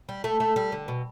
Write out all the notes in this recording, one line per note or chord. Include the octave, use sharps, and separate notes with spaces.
G3
A3
A3
G3
D3
B2